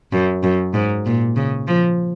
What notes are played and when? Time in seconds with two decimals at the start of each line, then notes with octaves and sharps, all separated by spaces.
0.12 F#2
0.43 F#2
0.74 G#2
1.06 A#2
1.36 C#3
1.68 F3